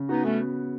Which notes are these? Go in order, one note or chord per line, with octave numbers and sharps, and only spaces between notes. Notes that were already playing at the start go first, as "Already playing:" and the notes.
Already playing: C#3
B3 D#4 F#4
A3 B3 C#4